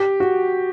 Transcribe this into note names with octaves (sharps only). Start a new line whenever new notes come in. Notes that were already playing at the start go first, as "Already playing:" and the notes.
Already playing: G4
F#4